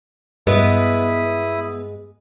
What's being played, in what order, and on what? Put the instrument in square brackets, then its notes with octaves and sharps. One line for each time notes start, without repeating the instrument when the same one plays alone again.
[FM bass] G2 [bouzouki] G#3 [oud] B3 [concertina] E4 B5 D#6